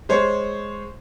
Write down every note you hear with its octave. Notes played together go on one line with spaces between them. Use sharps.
G#3 C5 C#5